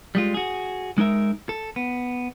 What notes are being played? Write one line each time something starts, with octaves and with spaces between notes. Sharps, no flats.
G3 G#3 F4
F#4 G#4
G#3 D#4 A#4 E5
A4
B3